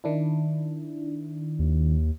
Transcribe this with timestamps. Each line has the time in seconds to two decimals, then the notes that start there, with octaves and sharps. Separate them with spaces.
0.04 D#3 D4 E4
1.59 D#2